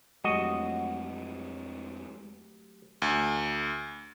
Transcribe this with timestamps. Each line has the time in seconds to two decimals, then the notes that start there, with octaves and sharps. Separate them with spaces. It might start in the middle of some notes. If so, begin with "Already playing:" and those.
0.24 F2 F#3 G#3 A3 F#4 G4 D#5
3.02 D2